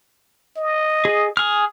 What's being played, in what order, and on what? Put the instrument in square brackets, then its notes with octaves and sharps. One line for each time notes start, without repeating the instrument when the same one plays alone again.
[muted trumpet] D#5
[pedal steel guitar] G#4
G#4 F6